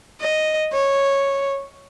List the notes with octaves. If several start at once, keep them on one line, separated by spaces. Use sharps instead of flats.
D#5
C#5